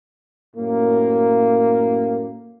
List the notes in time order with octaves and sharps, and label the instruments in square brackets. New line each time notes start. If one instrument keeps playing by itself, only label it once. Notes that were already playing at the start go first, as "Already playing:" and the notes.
[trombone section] F#2 A2 A#3